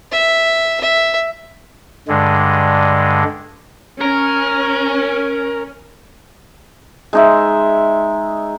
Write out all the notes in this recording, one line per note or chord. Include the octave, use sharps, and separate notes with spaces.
E5
E5
G2 D3 G#3
C#4 A#4
G#3 D#4 E5